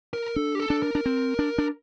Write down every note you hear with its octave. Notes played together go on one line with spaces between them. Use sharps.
A#4
D4 A4
G4
A4
D4
A#4
D4
C4
D4
D4